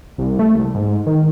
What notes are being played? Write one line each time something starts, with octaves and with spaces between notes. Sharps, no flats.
C2
A3
C2
G#2
D#3